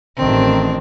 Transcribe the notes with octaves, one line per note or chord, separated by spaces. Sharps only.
A1 D#3 C4 D4